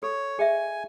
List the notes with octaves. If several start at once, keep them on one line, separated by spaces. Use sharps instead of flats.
A4 C#5
G#4 D#5 E5 G#5